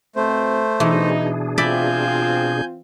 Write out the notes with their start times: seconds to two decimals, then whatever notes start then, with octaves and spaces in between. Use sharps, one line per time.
0.16 B2 A3 C4 C5
0.80 B2 E3 D4 D#4 G#4
1.58 C4 F4 D5 E5 G#5 B5 G6